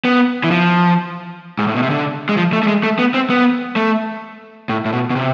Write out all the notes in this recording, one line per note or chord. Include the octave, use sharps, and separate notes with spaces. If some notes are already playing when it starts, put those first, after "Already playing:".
B3
E3
F3
G#2
A2
B2
C3
D3
G#3
F3
A3
A3
G#3
A3
B3
C4
B3
A3
A2
A2
B2
B2
C3